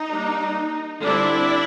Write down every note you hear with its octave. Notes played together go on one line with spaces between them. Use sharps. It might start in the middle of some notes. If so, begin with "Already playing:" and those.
Already playing: D#4
G3 A#3 D4
D3 G3 C4 D4 E4